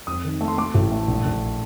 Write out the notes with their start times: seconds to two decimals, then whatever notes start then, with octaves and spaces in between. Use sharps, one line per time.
0.07 F2 D#6
0.24 D#3
0.41 A3
0.48 C6
0.58 A3 D6
0.74 A1
0.92 A3
1.07 A#1
1.25 A#1